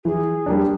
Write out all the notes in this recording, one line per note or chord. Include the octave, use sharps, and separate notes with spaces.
E3 G#4
G3 A#3 D4